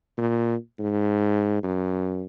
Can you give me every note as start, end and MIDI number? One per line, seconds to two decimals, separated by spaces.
0.18 0.56 46
0.79 1.60 44
1.63 2.25 42